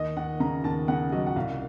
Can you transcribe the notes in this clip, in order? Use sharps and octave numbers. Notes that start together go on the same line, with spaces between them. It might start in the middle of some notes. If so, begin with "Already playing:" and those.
Already playing: D#2 D#5
D#2 F#5
C#3 A#5
D#2 A5
C#3 F#5
F#3 D#5
F#5
C2 F5